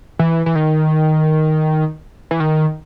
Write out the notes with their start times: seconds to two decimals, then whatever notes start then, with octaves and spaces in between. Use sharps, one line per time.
0.19 E3
0.46 E3
0.55 D#3
2.31 E3
2.40 D#3